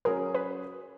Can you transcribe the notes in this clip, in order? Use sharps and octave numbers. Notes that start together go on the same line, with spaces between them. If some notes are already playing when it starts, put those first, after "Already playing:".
F#3 C#4 G#4 A#4
B4